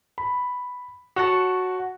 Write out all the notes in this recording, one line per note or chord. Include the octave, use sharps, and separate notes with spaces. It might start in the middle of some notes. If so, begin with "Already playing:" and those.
B5
F#4 C#5 F#5 A5